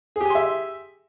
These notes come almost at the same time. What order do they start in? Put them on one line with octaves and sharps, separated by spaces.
G#4 G4 G#5 C6 E5